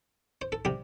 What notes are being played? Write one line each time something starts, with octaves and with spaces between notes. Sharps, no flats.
C5
A4
C3 G3 G4